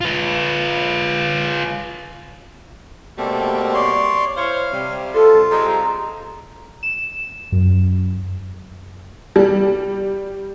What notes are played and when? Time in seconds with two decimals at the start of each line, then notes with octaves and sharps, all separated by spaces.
0.01 F4 B4
3.18 B2 G3 A3 A#3 C4 A4
3.74 C#5 D5 C6
4.37 E4 C5 C#5 F5
4.72 C3 G3
5.14 F4 A4
5.51 G3 G#3 C4 A#5
6.83 E7
7.52 F#2
9.36 G3